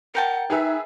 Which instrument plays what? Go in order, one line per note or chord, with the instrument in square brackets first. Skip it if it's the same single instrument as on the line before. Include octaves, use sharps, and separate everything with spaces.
[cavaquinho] A#4 G5 A5 [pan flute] F#5
[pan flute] D#4 [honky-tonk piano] G#4 B4 E5